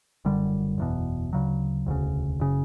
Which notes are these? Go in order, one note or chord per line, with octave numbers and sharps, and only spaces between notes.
F#1 F#2 D3 G3
F#1 E2 B2
D2 C#3 F#3
E1 D2 C#3
F#1 C#3